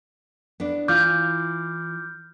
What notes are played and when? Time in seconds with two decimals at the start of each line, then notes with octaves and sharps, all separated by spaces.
0.60 B3 D4
0.88 E3 F4 D6 F6 G6